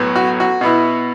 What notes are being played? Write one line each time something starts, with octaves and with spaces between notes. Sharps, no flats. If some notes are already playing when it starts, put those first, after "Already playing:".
Already playing: B1 A2 F#3 B3
F#4
F#4
B2 B3 E4